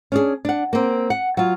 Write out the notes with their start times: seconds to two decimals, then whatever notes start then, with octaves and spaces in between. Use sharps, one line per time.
0.12 C#4 D4 G#4
0.45 D4 F#5
0.73 A#3 C4
1.10 F#5
1.37 F#3 F4